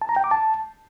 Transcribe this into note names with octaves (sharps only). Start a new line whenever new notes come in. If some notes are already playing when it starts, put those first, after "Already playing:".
A5
A#5
G5
D6
A5